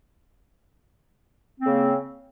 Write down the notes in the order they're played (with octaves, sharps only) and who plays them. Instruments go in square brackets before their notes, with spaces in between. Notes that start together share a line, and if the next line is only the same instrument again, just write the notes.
[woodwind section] C4
A#3
C#3